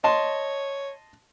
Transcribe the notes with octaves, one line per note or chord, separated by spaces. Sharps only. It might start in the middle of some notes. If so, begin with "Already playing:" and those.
C#5 D#5 A5 C6